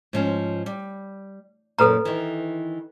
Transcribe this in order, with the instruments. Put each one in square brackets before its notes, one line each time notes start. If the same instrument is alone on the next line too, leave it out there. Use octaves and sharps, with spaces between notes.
[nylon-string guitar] G#2 F3 C#4
G3
[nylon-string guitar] F#2 A#2 [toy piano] A4 B4 A#5
[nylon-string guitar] D#3 E3